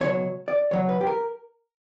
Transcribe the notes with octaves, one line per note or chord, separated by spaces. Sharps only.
C#2 B2 F#3 C#5
D5
C#2 B2 F#3 C#5
B4
G4
A#4